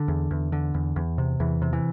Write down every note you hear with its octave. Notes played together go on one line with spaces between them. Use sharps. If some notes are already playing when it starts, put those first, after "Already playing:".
Already playing: D3
E2
E2
D3
E2
E2
C3
E2 E3
C3
E3